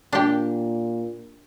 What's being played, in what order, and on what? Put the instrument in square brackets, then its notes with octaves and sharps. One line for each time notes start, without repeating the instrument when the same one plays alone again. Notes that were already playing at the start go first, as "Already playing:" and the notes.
[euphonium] A#2 [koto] D4 G4